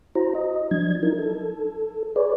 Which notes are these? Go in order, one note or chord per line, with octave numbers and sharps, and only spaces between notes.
E4 F#4 C5 A#5
D#5
F3 F#3 D4 G#6
D#4 E4 A#4
A4
G#4 B4 C#5 D5